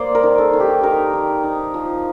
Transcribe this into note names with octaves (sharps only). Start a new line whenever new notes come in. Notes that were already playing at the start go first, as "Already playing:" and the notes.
Already playing: A#3 C5 D5
A#4
D#3
A4
D#3
G4
D#4 A#4
D#3
D#4
F3